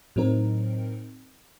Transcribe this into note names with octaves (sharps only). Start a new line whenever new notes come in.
A2 F#3 C4 D#4 A#4